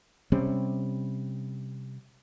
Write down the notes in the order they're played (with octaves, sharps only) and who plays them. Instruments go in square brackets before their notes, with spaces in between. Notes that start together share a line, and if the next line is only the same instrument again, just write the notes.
[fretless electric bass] C3 G3 C4 C#4